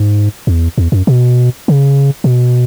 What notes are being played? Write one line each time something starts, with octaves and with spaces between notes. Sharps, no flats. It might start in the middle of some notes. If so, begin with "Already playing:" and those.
Already playing: G#2
E2
E2
F#2
B2
C#3
A#2
B2